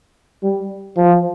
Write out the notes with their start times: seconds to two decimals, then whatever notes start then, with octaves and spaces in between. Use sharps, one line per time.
0.43 G3
0.97 F3